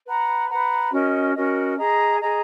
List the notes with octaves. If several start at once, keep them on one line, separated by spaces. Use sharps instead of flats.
B4 F#5 A#5
B4 F#5 A#5
C#4 F#4 A#4 D#5
C#4 F#4 A#4 D#5
G#4 D#5 A#5
G#4 D#5 A#5